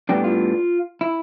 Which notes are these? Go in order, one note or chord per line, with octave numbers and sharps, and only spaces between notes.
A2 G3 B3 D4 G4
F4
E4